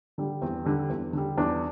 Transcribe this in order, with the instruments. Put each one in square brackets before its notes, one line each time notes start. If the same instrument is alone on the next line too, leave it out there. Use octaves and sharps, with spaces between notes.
[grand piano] D3 G3
E2 C4
D3 G3
E2
D3 G3
E2 D4